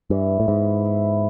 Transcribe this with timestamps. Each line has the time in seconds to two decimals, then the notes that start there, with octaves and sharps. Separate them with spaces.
0.10 G2 E3
0.40 A2
0.48 G#2 B3
0.85 E4